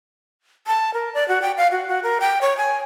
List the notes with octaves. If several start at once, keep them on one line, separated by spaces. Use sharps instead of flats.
A5
A#4
D5
F#4
G5
F5
F#4
F#4
A#4
G5
C#5
G#5